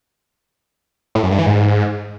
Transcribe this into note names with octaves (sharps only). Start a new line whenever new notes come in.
A2
F#2
G2
E3
G#2